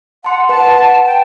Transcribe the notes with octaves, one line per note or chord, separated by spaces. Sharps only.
F#5 A5 C6
B4 F#5 A5
G5